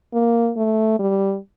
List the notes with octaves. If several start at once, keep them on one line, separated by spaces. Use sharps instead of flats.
A#3
A3
G3